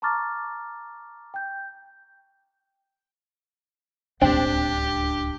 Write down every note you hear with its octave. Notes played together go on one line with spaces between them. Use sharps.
A5 A#5 C#6 D6 F6 A6
G5 G6
D1 C#2 C4 D4 G4